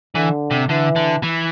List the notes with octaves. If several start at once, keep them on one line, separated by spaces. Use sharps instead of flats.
D3 E3
C3
D3 E3
D3
E3